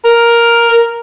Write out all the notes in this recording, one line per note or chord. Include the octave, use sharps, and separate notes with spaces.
A#4